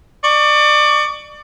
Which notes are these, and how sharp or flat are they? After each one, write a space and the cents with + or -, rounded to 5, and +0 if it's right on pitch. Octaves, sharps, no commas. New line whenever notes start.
D5 +30 C#6 +35